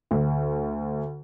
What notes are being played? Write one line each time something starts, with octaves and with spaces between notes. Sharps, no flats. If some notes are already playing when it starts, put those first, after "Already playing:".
D2